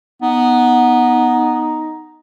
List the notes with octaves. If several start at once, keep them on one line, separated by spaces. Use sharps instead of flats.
B3 D#4